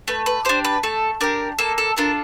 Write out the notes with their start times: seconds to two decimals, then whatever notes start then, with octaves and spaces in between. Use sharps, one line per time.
0.08 A3 B4
0.26 B4
0.45 D4 G4 C5
0.64 B4
0.83 A3 A4
1.21 D4 G4 A#4
1.59 A#3 A4
1.78 A4
1.96 D4 F4 A4 A#4